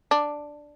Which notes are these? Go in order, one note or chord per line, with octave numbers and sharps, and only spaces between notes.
D4